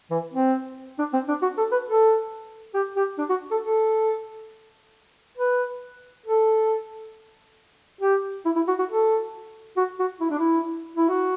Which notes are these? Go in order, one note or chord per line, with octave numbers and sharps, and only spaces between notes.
E3
C4
D4
C4
D4
F#4
A4
B4
A4
G4
G4
D4
F#4
A4
A4
B4
A4
G4
E4
E4
F#4
F#4
A4
F#4
F#4
E4
D4
E4
E4
F#4